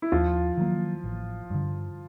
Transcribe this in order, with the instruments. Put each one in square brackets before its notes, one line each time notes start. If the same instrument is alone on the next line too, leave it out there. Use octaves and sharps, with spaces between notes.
[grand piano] E4
[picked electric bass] D#2 [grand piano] F3 F4
[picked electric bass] D#3 F#3 A#3
A1
G2 D3